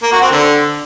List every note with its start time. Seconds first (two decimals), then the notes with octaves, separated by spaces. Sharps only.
0.03 A#3
0.12 F#4
0.22 C4
0.31 D3